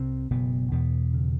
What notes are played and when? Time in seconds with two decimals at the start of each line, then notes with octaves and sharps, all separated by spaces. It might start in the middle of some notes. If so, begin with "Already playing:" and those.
Already playing: C2 C3 C4
0.30 F#1 B2 B3
0.72 E2 B2 B3
1.13 C#3